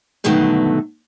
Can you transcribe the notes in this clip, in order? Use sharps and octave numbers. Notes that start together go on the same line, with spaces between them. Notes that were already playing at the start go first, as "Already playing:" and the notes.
G2 B2 D3 D#3 F#3 A3